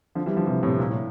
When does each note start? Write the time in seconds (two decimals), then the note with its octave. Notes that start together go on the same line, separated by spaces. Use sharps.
0.15 D3 F3
0.26 E3 G3
0.37 D3 F3
0.47 C3 E3
0.63 A2 C3
0.79 A#2
0.91 A2